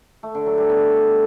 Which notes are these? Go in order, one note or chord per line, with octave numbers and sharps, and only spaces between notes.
A3
D3
F#3
G3
B3